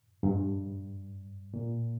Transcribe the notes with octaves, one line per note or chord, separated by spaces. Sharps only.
G2
A#2